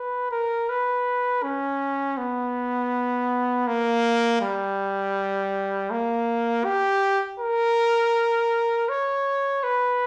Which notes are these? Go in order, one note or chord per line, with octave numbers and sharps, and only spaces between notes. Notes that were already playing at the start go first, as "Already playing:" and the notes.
Already playing: B4
A#4
B4
C#4
B3
A#3
G3
A#3
G4
A#4
C#5
B4